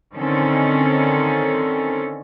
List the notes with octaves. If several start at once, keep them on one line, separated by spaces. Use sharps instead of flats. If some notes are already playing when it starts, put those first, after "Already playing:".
D3 D#3 C4 C#4 A4